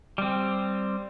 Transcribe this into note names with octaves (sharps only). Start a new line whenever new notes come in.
G3 C4